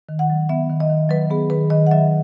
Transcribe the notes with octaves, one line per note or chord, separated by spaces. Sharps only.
D#3
F#5
F#3
B3 E5
D#3
D#5
D#3
F#3 B4
B3 G#4
D#3 B4
D#3 D#5
F#5
F#3 E5